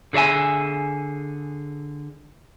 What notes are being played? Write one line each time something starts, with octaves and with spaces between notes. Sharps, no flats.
D3 G#4 D5 E5 G#5